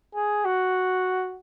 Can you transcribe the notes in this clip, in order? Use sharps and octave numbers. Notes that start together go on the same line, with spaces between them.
G#4
F#4